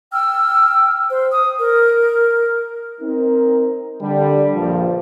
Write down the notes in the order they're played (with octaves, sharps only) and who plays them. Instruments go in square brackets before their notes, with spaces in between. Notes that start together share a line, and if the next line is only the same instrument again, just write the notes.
[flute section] G5 E6 F6
C5
D#6
A#4
[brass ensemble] C4 D#4 A#4
D3 G3
A#1 G2 A#2 F3